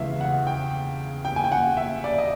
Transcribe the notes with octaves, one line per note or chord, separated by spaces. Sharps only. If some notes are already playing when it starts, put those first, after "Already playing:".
Already playing: E2 C#3 E3 G#3 E5 F5
F#5
G5
G5
G#5
G5
F#5
E5
D5
D#5